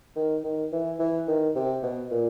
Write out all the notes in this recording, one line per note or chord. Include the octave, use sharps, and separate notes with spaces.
D#3
D#3
E3
E3
D#3
C3
B2
A#2